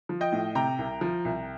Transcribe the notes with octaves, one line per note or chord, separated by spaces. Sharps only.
F3
D#5 G5
A2
C3 G5 A#5
C2
F3
C2